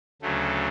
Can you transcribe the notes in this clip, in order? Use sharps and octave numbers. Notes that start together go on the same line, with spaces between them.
D2 C#3 F#3 A3